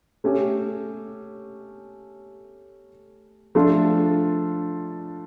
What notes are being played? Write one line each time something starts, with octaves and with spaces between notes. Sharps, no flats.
A3 C#4 G4
F3 A3 D4 F4